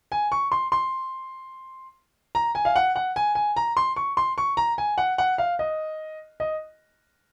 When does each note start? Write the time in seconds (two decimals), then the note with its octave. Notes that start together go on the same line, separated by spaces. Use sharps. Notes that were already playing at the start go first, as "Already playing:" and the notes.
0.12 G#5
0.32 C#6
0.52 C6
0.72 C6
2.35 A#5
2.55 G#5
2.65 F5
2.76 F#5
2.96 F#5
3.16 G#5
3.35 G#5
3.56 A#5
3.77 C6
3.96 C#6
4.17 C6
4.38 C#6
4.57 A#5
4.78 G#5
4.98 F#5
5.18 F#5
5.38 F5
5.59 D#5
6.40 D#5